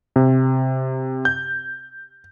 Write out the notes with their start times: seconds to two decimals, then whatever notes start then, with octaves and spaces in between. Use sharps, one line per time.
0.16 C3
1.25 G6